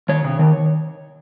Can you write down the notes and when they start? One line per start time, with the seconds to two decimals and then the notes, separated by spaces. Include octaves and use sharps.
0.09 D#3 C#5
0.24 C3
0.39 D#3